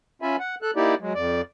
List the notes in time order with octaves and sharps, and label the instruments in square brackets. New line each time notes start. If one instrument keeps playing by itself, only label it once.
[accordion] C#4 F4 E5 G#5 B5
F#5
A4 F#6
A#3 D#4 E4 G4 D5
F#3 G#3
F2 D5